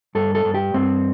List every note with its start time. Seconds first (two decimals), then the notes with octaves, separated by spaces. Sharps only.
0.15 G2 A4
0.35 A4
0.45 G2
0.54 G4
0.74 G2 C4